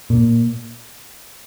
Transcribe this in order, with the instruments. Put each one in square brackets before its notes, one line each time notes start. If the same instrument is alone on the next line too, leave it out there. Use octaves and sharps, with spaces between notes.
[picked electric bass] A#2